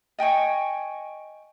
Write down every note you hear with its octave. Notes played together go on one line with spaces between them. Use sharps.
D#5 G5 G#5 C#6